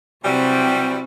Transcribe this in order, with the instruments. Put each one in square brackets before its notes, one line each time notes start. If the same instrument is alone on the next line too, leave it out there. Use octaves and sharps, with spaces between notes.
[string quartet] C3 C4 [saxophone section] E3 F#3 G3